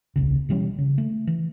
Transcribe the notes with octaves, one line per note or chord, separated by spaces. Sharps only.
D#1 C2 C#3
B2 E3 G3 C#4
C#3
A3
E3